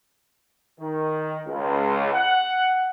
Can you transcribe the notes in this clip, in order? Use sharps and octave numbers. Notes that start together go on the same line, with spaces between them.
D#3
C#2
F#5